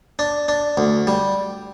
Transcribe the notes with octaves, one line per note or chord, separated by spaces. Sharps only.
D4
D4
D2
G3